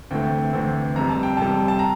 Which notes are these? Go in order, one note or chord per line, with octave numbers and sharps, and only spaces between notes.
D2 C3 E3 A3 C4 G5
D2 C3 E3 A3 C4
F2 C3 G3 A#5
A5
G5
F2 C3 G3 A5
A5
A#5